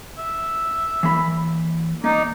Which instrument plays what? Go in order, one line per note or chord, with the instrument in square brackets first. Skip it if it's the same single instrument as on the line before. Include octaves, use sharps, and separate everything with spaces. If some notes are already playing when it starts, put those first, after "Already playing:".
[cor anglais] E5
[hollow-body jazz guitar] E3 A#3 B5
[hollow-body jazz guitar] A#3 [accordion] D#4 [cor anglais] D5